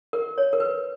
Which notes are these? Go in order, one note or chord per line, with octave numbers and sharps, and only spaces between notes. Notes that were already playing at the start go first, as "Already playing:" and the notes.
A#4
C#5
A#4
B4